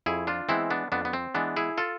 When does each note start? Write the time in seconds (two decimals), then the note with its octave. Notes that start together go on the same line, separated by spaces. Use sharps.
0.06 F2 E4 G#4
0.27 D4 F4
0.49 E3 G#3 B3 C4 E4
0.70 B3 D4
0.92 F2 B3 D4
1.05 B3
1.13 C4
1.35 E3 G#3 B3 D4
1.56 E4 G#4
1.78 F4 A4